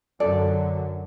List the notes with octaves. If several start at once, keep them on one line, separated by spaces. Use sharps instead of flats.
F#2 D3 F#3 A4 D5